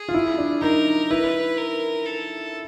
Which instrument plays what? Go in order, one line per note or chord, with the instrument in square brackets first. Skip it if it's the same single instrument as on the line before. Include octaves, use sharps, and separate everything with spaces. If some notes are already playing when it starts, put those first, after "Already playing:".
Already playing: [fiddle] G#4
[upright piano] F4
E4
D4
[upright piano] D#4 [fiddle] A#4
[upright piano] E4 [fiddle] B4
[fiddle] A#4
A4